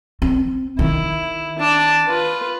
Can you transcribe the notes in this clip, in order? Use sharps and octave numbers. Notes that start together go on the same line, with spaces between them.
C4
D#3 E4
D4 A5
F4 B4